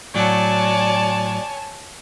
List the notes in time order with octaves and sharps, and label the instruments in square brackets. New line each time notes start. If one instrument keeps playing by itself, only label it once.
[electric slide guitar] A2 F#3 [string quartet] C#5 G#5 A5 [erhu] D5